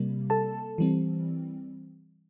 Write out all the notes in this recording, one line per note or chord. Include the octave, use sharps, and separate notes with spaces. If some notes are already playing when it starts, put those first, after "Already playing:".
Already playing: C3 G3 A#3
A4 A5
E3 G3 C4